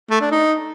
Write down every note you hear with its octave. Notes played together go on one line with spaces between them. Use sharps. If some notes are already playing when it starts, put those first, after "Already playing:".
A3
D4
D#4